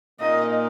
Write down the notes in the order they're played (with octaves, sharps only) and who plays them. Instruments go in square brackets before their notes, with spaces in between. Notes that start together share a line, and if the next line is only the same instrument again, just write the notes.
[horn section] A#2 A#3 D#4 A#4 [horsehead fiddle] D#5